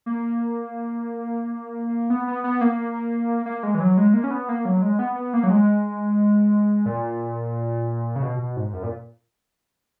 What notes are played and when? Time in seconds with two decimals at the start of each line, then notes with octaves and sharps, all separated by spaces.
0.06 A#3
2.10 B3
2.28 B3
2.44 B3
2.61 A#3
3.46 A#3
3.63 G#3
3.75 E3
3.80 F#3
3.97 G#3
4.14 A#3
4.24 C#4
4.31 B3
4.49 A#3
4.65 F#3
4.82 G#3
4.99 B3
5.16 B3
5.33 A#3
5.43 F#3
5.50 G#3
6.86 A#2
8.16 C#3
8.22 B2
8.39 B2
8.57 G#2
8.73 F#2
8.83 A#2